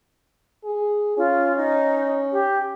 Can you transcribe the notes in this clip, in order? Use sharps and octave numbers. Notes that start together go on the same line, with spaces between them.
G#4
C#4 F4
D#4
G4